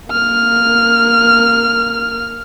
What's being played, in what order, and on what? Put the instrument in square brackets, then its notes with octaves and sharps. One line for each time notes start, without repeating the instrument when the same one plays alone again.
[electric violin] A#3 F6